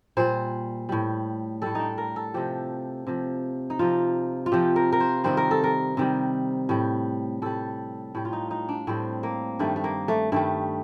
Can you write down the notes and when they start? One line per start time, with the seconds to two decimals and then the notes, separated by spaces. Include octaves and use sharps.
0.17 A#2 G3 C5
0.89 A2 G3
1.62 A2 G3 A4
1.75 D4 D#4
1.98 A#4
2.16 A4
2.34 C3 F3 G4
3.07 C3 F3
3.70 D#4
3.79 C3 F3 F4
4.46 F4
4.52 C3 F3 G4
4.76 A#4
4.92 A#4
5.00 C5
5.24 C3 D#3 G3 C5
5.37 A#4
5.51 A4
5.64 A#4
5.97 C3 D#3 G3
6.69 A2 G3
7.42 A2 G3 A4
8.15 A2 G3
8.25 F4
8.33 D#4
8.51 D#4
8.69 D4
8.87 A2 G3 C4
9.23 A#3
9.59 G2 D#3 G3 A3
9.76 A3
9.84 A#3
10.08 A3
10.32 G2 D#3 G3 A3